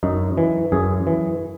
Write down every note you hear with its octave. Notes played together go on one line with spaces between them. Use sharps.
F#2 D#4
E3
F#2 G#4
E3